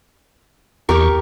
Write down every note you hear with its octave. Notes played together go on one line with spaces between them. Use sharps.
E2 G4 A#4 C#6